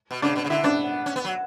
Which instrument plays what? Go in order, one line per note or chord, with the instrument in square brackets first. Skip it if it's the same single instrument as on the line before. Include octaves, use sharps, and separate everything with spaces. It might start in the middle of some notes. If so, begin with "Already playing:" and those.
[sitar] B2
[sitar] C#3 [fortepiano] D4
[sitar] B2
C#3
[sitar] D3 [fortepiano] E4
[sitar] B3 [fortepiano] D4
[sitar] C#4
B3
F#3